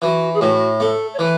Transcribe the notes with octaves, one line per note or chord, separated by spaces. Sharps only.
E3 F#4
G#4
A2 F#4
A3 A4
C#5
E3 B4